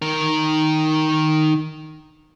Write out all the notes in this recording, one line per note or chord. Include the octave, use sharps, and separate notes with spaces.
D#3 A#4